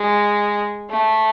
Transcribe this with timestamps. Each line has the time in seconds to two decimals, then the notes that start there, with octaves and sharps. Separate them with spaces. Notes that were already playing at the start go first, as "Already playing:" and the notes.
Already playing: G#3
0.89 A3